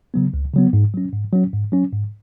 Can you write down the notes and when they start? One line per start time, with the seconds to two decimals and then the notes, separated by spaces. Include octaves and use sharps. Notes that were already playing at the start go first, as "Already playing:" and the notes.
0.14 C#3 F#3 B3
0.34 C#2
0.54 C#3 F#3 B3
0.73 G#2
0.94 F#3 C#4
1.13 G#2
1.32 F#3 C#4
1.53 G#2
1.72 F#3 C#4
1.93 G#2